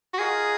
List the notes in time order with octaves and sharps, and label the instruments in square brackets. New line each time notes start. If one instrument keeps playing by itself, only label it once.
[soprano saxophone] F#4
[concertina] F4 A#4 D#5 F#5 [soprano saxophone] G#4